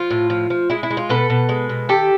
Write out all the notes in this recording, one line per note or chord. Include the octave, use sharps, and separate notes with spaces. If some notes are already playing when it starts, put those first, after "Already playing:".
Already playing: F3 F4
A2
F3
F3
G#3 E4
E4
G#3
F4
B2 A4 B4
B2
G#3
B2
D#3 G4 A4